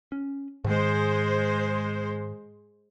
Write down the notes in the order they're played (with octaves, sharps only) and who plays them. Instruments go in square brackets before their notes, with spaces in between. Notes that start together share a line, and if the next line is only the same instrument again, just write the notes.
[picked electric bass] C#4
[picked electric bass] G#2 D#3 [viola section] G#3 C5